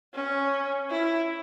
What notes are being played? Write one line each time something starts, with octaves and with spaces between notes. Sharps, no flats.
C#4
E4